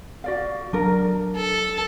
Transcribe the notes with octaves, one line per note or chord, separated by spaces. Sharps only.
F#4 D5 F5
F#3 D4 A#4
A4